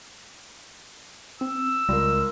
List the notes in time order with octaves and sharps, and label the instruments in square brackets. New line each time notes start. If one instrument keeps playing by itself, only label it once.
[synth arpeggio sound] C4 [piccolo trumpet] E6
[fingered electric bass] C#2 [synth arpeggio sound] G3 [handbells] F4 A#4